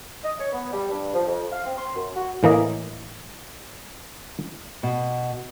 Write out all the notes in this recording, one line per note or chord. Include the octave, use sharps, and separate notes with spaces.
D#5
C#5
B3
G3
G2
F3
F2
F5
C4
C6
F#2
F#4
A2 E3 A#3 D#5
B2